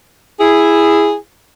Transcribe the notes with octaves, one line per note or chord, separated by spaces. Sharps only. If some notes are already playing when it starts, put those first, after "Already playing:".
E4 G#4